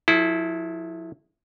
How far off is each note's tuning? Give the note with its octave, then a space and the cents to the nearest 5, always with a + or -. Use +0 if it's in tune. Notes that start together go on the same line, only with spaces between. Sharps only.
F3 +40 E4 -5 A4 -45